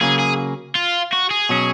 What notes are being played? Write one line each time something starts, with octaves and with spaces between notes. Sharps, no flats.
C#3 F#3 A#3 G#4
G#4
F4
F#4
G#4
B2 F#3 C#4 F#4